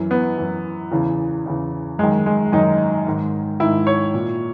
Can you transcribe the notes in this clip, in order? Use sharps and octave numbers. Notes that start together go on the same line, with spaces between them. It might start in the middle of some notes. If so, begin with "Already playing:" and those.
Already playing: F#2 E3
B3
F#2 E3
E2 C#3 E3
E2 C#3 E3
F#2 D#3 G#3
G#3
F#2 D#3 D#4
G#2 D#3
G#2 D#3 E4
C#5
A#2